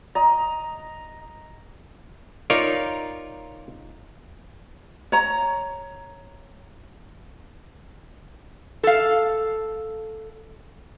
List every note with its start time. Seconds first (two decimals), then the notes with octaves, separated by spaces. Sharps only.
0.15 D#5 A#5
2.50 D#4 F4 A#4 C#5 D5
5.12 C#5 A#5
8.83 A4 F5